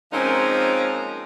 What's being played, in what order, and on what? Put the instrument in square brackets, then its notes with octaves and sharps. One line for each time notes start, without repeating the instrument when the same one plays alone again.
[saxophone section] F3 G#3 A#3 C4 C#4 D#4